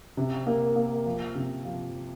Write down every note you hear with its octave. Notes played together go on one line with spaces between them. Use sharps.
C3
A#3
A#3
F3
C3
F3